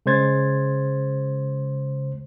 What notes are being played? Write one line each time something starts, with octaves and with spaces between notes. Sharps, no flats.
C#3 G#3 C5 G#6 A6